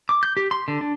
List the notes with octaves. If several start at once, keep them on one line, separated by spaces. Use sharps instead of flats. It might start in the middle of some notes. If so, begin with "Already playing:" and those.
D6
G6
G4
C6
D3
D4